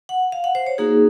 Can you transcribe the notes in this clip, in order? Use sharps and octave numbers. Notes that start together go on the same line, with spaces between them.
F#5
F5
F#5
C5
C#5
A#3 D#4 F#4 G#4